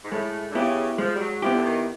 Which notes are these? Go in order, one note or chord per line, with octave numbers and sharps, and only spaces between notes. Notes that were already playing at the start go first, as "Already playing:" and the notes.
G#2
A2 G#3
D3
C#3 B3 E4 G4
F3 G#3
G3
F#3
F3 B3 E4 G4
D3
D#3